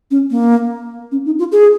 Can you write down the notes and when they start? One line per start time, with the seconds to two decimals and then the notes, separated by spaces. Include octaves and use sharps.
0.11 C#4
0.31 A#3
1.12 C#4
1.25 D#4
1.39 F4
1.52 G#4